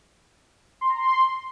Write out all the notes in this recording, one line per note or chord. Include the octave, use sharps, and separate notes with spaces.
C6
A#5
C6